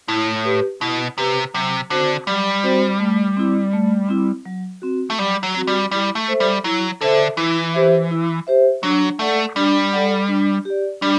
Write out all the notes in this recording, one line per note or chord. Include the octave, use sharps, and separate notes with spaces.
A2 E4
G4 B4
B2 E4
C3 G4 B4
C3 F#3
D3 C4 F#4 C5
F#3 G3
C4 F#4 C5
A3
C4 E4
A3
C4 E4
F#3
C4 F#4
A3
F#3 G3
F#3
C4 F#4
G3
G3 E4
A3
A4 C5 E5
G3
F#3 E4
D3 A4 C5 E5
E3 E4
G4 C5 E5
E4
G4 C5 E5
F#3 D4
A3 A4 D5 F#5
G3 D4
A4 D5 F#5
D4
G4 D5
G3 D4